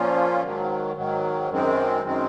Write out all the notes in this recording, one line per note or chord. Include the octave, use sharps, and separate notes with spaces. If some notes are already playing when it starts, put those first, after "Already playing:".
Already playing: A#2 F3 A#3 C#4 F4
G#2 D#3 F#3
G#2 D#3 F#3
F#2 D#3 G#3 C4
F#2 D#3 G#3 C4